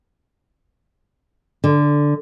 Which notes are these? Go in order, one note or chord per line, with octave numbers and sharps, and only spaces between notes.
D3